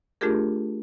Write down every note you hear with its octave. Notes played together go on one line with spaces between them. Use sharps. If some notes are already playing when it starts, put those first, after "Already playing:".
A3 D4 F4 G4 G#4 A#4